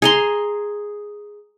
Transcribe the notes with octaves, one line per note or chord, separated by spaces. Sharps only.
G#4 A#5 C6